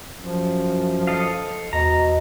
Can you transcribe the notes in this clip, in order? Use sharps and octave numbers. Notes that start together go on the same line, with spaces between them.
F#2 F3
A4 D#5 F5
E2 B2 D#5 A#5